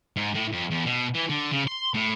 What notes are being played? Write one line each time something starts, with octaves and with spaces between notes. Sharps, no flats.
G#2
A2
F2
E2
B2
E3
D3
C#3
C6
A2